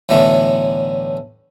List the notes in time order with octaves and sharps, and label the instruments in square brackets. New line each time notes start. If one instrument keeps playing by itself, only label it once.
[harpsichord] B1 A2 D3 E3 A3